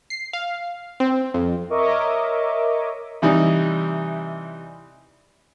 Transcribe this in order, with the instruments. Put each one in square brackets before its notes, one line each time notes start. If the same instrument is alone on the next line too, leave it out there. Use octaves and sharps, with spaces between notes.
[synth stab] C7
F5
C4
F2
[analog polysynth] A#4 C#5 D#5 E5 D6
[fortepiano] C3 E3 G3 D#4